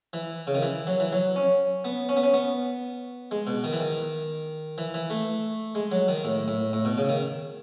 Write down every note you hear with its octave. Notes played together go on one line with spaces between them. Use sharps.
E3
C#3
D#3
E3
F#3
E3
F#3
C#4
B3
C#4
B3
C#4
B3
G#3
B2
D#3
E3
D#3
E3
E3
A3
G#3
F#3
D#3
A2
A2
A2
B2
C#3
D#3